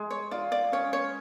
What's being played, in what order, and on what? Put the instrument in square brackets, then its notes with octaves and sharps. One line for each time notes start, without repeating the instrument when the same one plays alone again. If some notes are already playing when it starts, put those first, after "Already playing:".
Already playing: [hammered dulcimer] G#3
[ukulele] C#5
[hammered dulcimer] F4 [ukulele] D5
[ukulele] D5
[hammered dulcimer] C#4 [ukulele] C#5
[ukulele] C#5